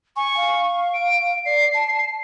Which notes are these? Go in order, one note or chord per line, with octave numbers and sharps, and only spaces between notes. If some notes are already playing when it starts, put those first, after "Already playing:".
G#5 C#6
F5
D7
D5 C7
A5